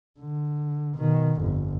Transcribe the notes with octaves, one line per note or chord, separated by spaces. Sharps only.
D3
B2 D#3
G1 F2